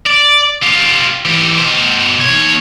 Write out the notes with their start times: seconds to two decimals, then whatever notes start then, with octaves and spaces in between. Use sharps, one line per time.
0.06 D5
0.62 F4 G4
1.25 E3 G4
1.58 B2 C5
2.20 D#2 C#5